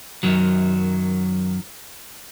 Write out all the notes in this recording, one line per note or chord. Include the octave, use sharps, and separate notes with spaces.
F#2 D#3 F#3